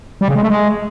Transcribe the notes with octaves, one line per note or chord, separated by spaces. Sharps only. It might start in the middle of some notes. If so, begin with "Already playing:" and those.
G3
C#3
G#3
A3
G#3